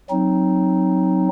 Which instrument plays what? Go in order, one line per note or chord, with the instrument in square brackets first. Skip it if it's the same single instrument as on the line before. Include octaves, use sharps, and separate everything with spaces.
[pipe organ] F#3 C4 D#4